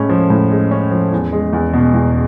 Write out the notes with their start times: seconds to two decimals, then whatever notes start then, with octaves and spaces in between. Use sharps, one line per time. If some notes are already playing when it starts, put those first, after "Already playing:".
Already playing: A2 G#3 C#4
0.10 F3
0.30 A2
0.51 G#3
0.71 C#4
0.91 F3
1.13 E2
1.33 G#3
1.53 E2
1.74 B2
1.94 E2